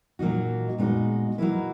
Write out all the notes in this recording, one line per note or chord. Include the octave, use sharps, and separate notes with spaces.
A#2 F#3 A#3 D#4 F#4
A#2 G#3 B3 D#4 F#4
B2 F#3 A#3 E4 B4